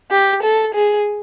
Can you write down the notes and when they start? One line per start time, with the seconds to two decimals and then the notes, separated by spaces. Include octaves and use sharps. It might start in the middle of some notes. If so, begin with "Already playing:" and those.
0.11 G4
0.43 A4
0.74 G#4